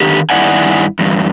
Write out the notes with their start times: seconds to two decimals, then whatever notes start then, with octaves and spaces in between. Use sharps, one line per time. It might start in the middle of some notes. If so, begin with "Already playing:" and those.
0.01 D3 D#3 G4
0.30 G2 D#3 E4 D5 F#5 G#5
0.99 E2 G2